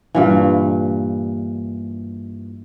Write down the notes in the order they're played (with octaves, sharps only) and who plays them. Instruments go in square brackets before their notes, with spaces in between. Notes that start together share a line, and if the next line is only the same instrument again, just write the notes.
[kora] G2 A#2 E3